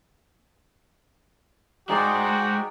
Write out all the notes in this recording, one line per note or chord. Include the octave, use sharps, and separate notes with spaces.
G#3 D#4 F#4 G#4 C5 D5 G5